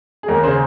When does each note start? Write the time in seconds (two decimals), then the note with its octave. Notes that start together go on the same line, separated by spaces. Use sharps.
0.23 G#4
0.28 D#2 A#4
0.43 C#3 G#4 C5